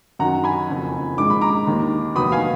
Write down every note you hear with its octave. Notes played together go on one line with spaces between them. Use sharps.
F#2 D#3 F#3 F#5 A#5
G#5 B5
F#1 F2 F3
A#1 G#2 D#3 G#3 D6
B5
A#5 D6
D#2 D#3 A#3
F1 D#2 D#3 F#3 B3 B5 D#6
F5 G#5